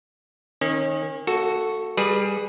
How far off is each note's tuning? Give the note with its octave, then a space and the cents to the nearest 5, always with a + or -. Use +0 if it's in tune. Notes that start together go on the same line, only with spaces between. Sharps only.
D#3 +0 C#4 -35
A#3 -40 F#4 +0 A4 +0
G3 +20 G#4 +0 B4 -15